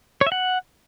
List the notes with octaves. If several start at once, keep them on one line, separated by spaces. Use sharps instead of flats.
C#5
E5
F#5